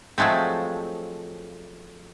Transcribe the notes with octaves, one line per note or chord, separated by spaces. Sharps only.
F3 F#3 G#3 A3 C4